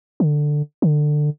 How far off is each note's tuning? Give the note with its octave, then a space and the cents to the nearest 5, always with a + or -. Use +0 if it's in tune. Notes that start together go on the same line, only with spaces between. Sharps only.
D3 +10
D3 +20